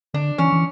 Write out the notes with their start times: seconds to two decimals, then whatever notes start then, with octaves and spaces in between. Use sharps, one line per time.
0.14 D3 D4
0.38 E3 C#4
0.52 E3